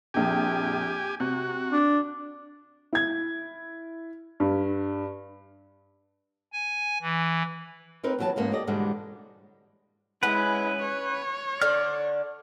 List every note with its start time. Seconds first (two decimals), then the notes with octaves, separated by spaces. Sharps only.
0.14 A#1 F2 G4 G#5
1.20 C3 F#4 G6
1.72 D4
2.93 E4 G#6
4.40 G2
6.53 G#5
7.02 E3
8.03 C4 D#4 A#4 B4
8.19 D#2 E3 F#3 A4 A5
8.36 E2 G#2 A#3 B3 C#4
8.52 G4 A4 D5 D#5
8.67 E2 G#2 B2 D3 G3 G#3
10.23 G#3 C#4 E4 B4 F#5
10.82 C#5
11.61 D3 D4 D5 F6